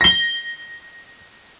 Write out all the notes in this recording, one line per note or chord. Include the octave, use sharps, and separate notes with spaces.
A#6 G7